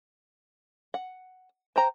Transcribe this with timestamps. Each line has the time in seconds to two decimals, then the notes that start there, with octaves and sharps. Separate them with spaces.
0.94 F#5
1.76 C5 G5 A#5